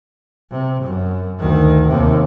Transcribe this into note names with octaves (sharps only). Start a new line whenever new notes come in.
C3
F#2
D2 D#3
D#2 C3